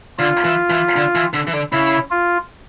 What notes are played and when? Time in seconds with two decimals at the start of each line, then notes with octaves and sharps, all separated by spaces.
0.19 D3 F4
0.44 E3
0.70 E3
0.96 D3
1.15 E3
1.34 D3
1.47 E3
1.53 D3
1.72 C#3 E4
2.11 F4